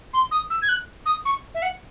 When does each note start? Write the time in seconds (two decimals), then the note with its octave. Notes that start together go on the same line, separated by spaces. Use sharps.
0.13 C6
0.31 D#6
0.50 E6
0.62 G#6
0.68 F#6
1.05 D#6
1.25 C#6
1.54 E5
1.62 F#5